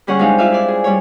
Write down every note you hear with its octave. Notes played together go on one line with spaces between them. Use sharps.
D3 G3 C#4 G#4 F#5 C#6
G#3 C4 D4 D#4 G4 F5
F4 D5 E5 F5
E4 D5
G#4
G3 C#5